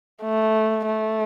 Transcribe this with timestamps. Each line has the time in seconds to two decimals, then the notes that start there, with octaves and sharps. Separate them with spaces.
0.23 A3
0.86 A3